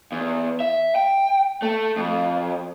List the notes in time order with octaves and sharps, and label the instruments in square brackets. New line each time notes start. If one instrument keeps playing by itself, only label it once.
[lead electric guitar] E2
E5
G5
A3
F2